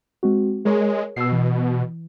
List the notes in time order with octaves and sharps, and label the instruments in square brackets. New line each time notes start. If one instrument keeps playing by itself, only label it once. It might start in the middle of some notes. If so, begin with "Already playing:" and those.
[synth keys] G#3 C4 F#4
[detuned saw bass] G#3 [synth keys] G#4 A#4 C#5
[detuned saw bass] B2 [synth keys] E6 C7
[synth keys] E3